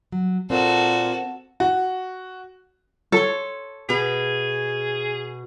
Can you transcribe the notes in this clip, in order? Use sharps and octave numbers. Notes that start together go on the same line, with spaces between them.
F#3
A#2 C4 F#4 A4
F#4
A4 C#5 C6
B2 G#4 B4